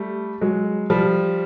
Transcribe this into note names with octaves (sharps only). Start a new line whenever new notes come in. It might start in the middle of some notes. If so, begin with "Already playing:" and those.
Already playing: G3 A3
F#3 G#3
F3 G3